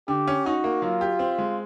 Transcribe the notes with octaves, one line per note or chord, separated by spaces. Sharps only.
D3 G4
C#4
D#4 F#4
A#3
F#3 F4
G4
C4
G#3